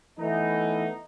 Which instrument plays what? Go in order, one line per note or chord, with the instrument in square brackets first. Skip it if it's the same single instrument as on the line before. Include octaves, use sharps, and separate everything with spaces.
[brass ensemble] E3 A3 B3 D#4